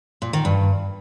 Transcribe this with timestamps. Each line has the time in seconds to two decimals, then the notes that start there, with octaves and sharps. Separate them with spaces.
0.22 A#2
0.33 D#3
0.45 G2